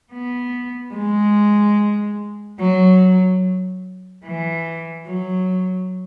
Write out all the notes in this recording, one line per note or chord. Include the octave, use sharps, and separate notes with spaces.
B3
G#3
F#3
E3
F#3